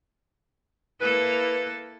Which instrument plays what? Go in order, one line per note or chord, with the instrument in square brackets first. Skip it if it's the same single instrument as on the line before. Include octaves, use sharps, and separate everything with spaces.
[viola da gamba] A#3 E4 A4 [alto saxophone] B4